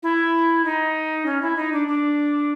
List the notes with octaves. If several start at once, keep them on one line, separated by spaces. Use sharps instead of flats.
E4
D#4
C#4
E4
D#4
D4
D4